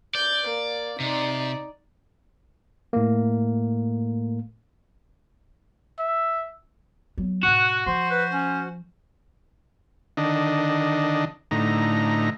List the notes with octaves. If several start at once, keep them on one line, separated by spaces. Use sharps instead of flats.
D5 G6
A#3
C3 D#4 D5
A2 A3 A#3
E5
F#3 B3
G#2 B2 F#4 F#5 F#6
F3 C5 C6
B4
C#4
D3 D#3 D4 D#5
A2 D3 D#4 A#5